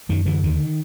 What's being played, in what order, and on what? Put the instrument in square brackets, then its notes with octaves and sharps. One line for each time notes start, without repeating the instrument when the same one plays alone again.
[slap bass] F#2 D#3
D3 E3
D#2 D#3